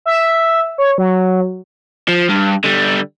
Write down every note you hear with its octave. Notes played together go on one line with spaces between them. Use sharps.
E5
C#5
F#3
F3
G2
D3 G3